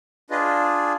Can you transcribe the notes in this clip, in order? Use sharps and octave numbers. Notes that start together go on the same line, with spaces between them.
D4 F4 G#4 B4 D#5